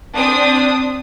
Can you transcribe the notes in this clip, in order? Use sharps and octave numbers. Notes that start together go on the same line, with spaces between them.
C4 D4 D#6